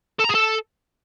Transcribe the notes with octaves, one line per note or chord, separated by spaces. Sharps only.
A4
A#5
G#4
A4